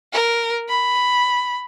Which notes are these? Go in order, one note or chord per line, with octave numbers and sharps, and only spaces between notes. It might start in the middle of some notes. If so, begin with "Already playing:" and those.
A#4
B5